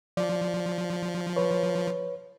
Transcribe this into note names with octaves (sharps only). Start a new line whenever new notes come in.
F3 D5
B4 C#5